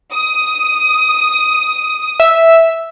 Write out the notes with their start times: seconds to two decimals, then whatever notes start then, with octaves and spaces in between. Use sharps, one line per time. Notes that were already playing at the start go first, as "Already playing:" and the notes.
0.13 D#6
2.20 E5